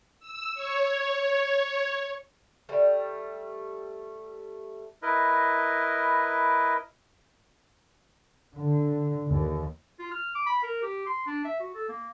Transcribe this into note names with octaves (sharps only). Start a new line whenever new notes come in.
E6
C#5
G3 A3
E4 A#4 B4 D#5
D3
D#2
F4
F6
D6
B5
A#4
G4
C6
D4
E5
F#4
A4
A#3